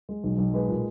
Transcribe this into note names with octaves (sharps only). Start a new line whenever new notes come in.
G#3
B1
B1
G#3 B4
A#2